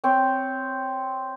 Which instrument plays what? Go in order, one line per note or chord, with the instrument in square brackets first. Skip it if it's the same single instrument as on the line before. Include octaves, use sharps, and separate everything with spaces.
[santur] C4 C#5 G5